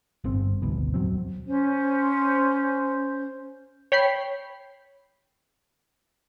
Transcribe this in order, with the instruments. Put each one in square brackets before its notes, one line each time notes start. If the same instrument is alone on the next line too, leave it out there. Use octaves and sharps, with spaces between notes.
[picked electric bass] G1 G2 C4
G#1 D2 B2
E1 F#3 C4
[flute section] C#4 C5
[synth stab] C#5 G5 B5 C7